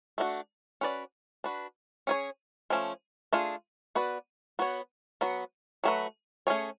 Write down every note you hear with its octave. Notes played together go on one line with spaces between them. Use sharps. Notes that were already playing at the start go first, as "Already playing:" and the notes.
A3 D4 F#4
C#4 F#4 B4 D5
D4 F#4 B4
C#4 G#4 C#5
F3 A3 C#4
A3 D4 F4 G#4
B3 F#4 B4 D5
B3 F#4 C#5
F#3 B3 F#4
F#3 A3 C#4 F#4 B4
A3 C#4 G#4 C#5